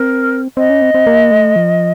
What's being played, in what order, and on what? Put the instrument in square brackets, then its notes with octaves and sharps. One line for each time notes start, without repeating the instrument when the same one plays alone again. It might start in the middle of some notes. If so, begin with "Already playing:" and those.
Already playing: [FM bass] C4 [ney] A#4
[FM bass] C4 [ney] D#5
[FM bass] C#4
C4
C4
A#3
A3
F3